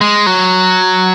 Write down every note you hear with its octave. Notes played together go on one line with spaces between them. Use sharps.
G#3
F#3